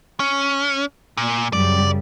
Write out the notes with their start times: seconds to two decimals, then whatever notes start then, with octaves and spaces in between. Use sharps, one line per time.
0.20 C#4
1.17 A#2
1.53 F#2 C#3 G3 D5